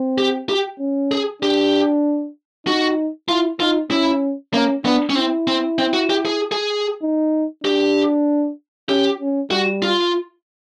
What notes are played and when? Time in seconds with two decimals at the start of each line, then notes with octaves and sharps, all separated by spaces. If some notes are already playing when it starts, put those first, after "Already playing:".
Already playing: C4
0.18 G4
0.49 G4
0.80 C#4
1.12 G#4
1.42 D4 G4
2.67 D#4 F#4
3.29 E4 F4
3.60 D#4 F4
3.91 C#4 E4
4.54 A#3 C#4
4.85 B3 D4
5.10 C#4
5.15 C4 E4
5.47 C4
5.79 C4
5.94 F#4
6.10 G4
6.25 G#4
6.52 G#4
7.03 D#4
7.64 D4 G4
8.89 C#4 G4
9.20 C#4
9.51 G3 F#4
9.82 F4